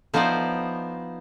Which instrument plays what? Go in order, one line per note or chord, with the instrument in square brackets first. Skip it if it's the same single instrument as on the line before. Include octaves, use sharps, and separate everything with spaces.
[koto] F3 B3 D#4 E4 C5 D5